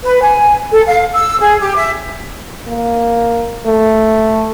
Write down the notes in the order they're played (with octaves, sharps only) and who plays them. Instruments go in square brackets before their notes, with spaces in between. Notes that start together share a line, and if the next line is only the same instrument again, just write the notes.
[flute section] B4
G#5
A4
F5
E6
G#4
G4
E5
[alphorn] A#3
A3